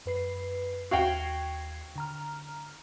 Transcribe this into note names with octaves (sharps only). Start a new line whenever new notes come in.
F#2 B4 C7
D#2 F#4 F5 G5 G#6 C7
D3 A#5 F6